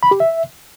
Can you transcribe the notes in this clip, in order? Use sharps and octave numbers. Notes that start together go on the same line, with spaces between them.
B5
G4
E5